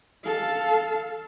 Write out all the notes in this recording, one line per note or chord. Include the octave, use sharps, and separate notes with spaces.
A4 F5